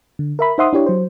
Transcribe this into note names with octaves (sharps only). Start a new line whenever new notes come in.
D3
A#4 E5 B5
D#4 C5 E5 F#5 C6 D#6
D4 E4 G4 C#5
F#3 C5